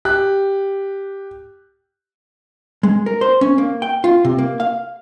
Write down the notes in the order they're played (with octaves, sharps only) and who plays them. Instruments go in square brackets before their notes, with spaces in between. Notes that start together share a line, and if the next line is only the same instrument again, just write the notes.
[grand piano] G4 F#6
[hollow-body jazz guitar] G#3
A#4
C5
C#4
A#3
G5
F4
C3
A#3
F5